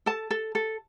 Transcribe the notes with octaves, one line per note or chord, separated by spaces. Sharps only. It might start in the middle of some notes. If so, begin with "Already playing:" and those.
A4 A5
A4
A4